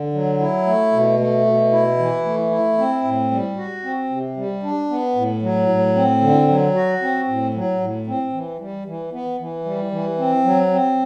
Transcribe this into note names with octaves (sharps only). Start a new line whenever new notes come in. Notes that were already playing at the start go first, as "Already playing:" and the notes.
Already playing: D3
F#3
E4
A3
B2
A3
B2
E4
E3
A3
E4
C4
A2
G3
F#4
C4
C3
G3
D4
B3
A2
F#3
A2
C4
D3
F#3
F#4
C4
A2
F#3
A2
C4
E3
G3
E3
B3
E3
G3
E3
C4
F#3
C4